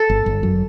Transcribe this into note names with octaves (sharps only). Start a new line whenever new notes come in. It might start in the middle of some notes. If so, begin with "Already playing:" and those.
Already playing: A4
G1
G1
F#2